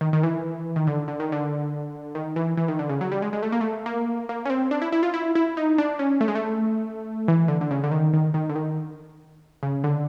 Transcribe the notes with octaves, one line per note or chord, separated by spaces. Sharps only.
D#3
D#3
E3
D#3
D3
D3
D#3
D3
D#3
E3
E3
D#3
D3
C#3
F#3
G3
G#3
G#3
A3
A#3
A3
A#3
A#3
C#4
C4
D4
E4
E4
F4
E4
E4
D#4
D4
C#4
A3
G#3
A3
E3
D3
D3
C#3
D3
D#3
D#3
D#3
D3
D#3
C#3
D3